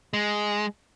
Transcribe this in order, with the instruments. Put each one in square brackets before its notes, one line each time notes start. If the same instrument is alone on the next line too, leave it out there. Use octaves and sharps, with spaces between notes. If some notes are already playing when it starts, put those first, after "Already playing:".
[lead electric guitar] G#3